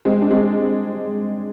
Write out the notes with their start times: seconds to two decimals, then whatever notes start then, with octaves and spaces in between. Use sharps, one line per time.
0.05 G#3 C4
0.22 D4
0.30 G#3 C4